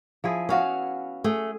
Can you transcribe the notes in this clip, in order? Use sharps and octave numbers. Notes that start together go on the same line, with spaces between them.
F3 E4 G#4
B3 C#4 F#4 F5
A3 G#4